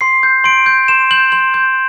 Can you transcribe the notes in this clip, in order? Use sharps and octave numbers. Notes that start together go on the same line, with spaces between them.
C6 C7
G6
C6 D7
G6
C6 E7
G6 F#7
C6 F#7
G6